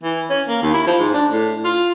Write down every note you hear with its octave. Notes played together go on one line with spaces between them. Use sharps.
E3
C#4
A#3
D#2
E4
F3
G#2
D4
A2
F4